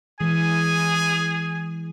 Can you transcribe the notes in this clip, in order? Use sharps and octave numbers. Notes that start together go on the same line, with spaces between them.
E3 G#3 G#4 G#5